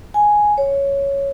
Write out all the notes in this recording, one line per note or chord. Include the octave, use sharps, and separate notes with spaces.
G#5
C#5